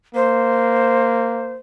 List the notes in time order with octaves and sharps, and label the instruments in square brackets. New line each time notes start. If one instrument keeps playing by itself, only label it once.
[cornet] A#3 [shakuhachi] C5